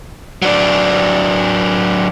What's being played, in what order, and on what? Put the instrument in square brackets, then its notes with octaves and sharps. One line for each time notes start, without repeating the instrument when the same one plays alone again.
[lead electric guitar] F#3 D4